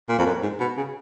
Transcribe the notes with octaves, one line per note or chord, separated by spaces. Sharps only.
A#2
F2
F#2
G#2
B2
C#3